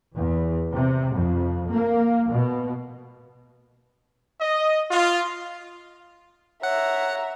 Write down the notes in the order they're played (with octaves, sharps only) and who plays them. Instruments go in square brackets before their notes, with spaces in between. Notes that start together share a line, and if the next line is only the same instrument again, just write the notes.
[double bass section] E2
C3
F2
A#3
B2
[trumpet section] D#5
F4
[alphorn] C#5 [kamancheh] E5 A#5 [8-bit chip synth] F#5